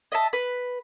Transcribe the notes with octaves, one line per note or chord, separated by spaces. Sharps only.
D#5 E5 A5
B4